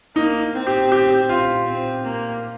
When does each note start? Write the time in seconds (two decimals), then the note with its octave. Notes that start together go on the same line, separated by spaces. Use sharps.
0.16 A#3 D#4
0.54 C4
0.67 G4
0.92 G4
1.29 F4
1.67 C4
2.05 A#3